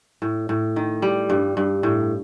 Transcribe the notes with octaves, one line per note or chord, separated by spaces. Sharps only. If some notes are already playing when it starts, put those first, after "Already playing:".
A2
A2
D#3
G3
G2
G2
A2